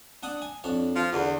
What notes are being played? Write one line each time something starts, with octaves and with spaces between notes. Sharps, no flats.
D4 F#5 D#6
G#5
F2 D4 C#5
F3
E2 D3